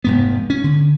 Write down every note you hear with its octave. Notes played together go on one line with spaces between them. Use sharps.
F1 G#2 B3
C#4
D3